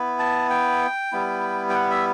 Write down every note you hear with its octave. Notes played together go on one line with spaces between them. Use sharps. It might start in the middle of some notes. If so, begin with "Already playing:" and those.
Already playing: B3 E4
A5
G5
G3 B3 E4
G5
F#5
E5